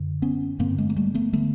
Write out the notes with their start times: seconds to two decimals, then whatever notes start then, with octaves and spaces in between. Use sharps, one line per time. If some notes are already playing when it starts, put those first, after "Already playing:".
Already playing: F#2 D3
0.22 B3 C#4
0.59 G2 D3 A#3 C4
0.78 G#3 A#3
0.90 A#3
0.96 G3 A3
1.14 A3 B3
1.33 D3 A3 B3